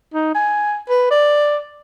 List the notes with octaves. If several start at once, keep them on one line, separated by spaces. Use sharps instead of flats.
D#4
G#5
B4
D5